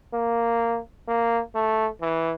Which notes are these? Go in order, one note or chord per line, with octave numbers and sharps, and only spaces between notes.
A#3
A#3
A3
E3